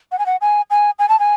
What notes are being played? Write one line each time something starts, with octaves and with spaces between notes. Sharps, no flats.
F#5
G#5
F#5
G#5
G#5
G#5
A5
G#5